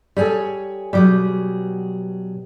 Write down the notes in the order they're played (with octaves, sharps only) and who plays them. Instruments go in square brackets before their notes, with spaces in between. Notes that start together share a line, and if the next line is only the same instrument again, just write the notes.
[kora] G3 A4 [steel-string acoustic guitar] G#4 C#5 G#5
[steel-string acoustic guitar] B2 F#3 G#4 [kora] G3 G4